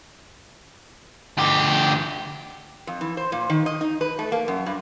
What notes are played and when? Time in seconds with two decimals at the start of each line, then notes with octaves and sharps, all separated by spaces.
1.38 D2 G4
2.87 F2
3.01 E3
3.17 C5
3.32 A#2
3.50 D#3
3.66 D#5
3.81 D#4
4.01 B4
4.19 A3
4.32 A#3
4.48 F#2
4.66 G2